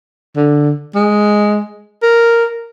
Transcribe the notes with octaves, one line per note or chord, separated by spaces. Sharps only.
D3
G#3
A#4